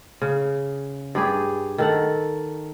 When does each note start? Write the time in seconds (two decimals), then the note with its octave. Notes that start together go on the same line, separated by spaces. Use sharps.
0.21 C#3
1.15 G2 G4 G#4
1.78 D#3 A4 F#5